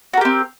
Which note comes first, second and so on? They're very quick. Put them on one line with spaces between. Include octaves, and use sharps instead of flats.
F#4 A#4 G4 C4